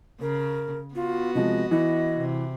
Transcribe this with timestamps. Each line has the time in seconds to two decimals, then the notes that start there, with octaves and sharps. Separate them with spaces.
0.21 C#3 A#4
0.95 B3 F4 F#4
1.35 C3 F3 G#3 D#5
1.71 E3 D#5
2.16 C3